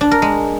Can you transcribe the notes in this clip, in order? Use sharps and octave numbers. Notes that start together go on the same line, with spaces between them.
D4
A#4
G#3